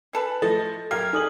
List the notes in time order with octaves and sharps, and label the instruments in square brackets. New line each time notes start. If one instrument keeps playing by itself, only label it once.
[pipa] E3 A4 B4
[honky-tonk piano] A2 F3 A3 [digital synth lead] A4 [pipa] D#5
[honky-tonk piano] F#2 G4 F5 [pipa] A#3 [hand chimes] F6 [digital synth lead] G#6
[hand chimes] D#4 A4 D#6 [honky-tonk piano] G#4 D5 F#7